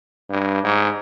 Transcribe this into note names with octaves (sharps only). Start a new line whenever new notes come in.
G2
G#2